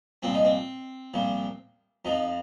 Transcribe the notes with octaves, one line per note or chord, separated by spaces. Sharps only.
C2 A#2 F3 C4
D#4
C4
C2 A#2 F3
F2 F3 D#4